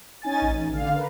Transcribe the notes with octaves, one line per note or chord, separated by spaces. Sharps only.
C#4 D#4 G#5 A6
A1
D3 F5
A#4 B4